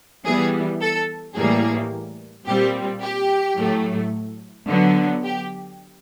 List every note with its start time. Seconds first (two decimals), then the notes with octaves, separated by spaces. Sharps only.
0.25 E3 G3 B3 G#4
0.81 A4
1.36 A2 E3 G3 A#3 G#4
2.46 A#2 G3 C4 G4
3.02 G4
3.57 A2 F#3 A3
4.68 D3 F#3 B3
5.24 G4